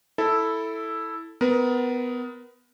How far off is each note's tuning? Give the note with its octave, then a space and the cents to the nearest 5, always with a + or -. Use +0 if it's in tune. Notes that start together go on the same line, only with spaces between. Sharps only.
E4 -5 A4 +0
B3 +20 A#4 +30